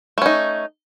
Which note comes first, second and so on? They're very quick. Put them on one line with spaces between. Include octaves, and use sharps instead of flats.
A3 C#4 D#4